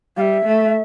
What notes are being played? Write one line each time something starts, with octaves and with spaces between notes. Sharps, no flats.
G3 E5 F5
A3